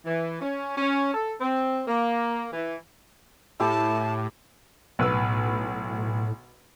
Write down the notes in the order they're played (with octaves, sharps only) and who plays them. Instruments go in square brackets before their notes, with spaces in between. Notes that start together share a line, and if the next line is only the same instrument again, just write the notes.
[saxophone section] E3
C#4
C#4
A4
C4
A#3
E3
[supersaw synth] A2 [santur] E4 G4 [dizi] A5
[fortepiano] B1 B4 E6 [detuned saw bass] A2